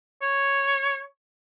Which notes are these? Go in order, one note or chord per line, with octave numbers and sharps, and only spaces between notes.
C#5